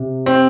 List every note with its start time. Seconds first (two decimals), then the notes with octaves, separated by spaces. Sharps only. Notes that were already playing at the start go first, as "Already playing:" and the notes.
Already playing: C3
0.26 C4